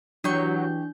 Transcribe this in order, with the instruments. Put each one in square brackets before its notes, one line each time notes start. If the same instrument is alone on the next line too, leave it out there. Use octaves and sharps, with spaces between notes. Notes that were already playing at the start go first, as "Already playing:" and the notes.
[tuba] E3 [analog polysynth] F#3 [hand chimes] D4 G6 [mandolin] G4 C#6